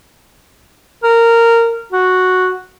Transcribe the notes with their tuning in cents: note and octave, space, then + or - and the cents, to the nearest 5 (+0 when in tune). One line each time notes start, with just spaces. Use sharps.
A#4 -15
F#4 -5